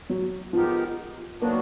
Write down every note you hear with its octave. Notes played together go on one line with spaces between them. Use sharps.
F#3
F3 G#3 B3 D#4 G4 A#4
D#3 F#3 A#3 B3 D4 F#4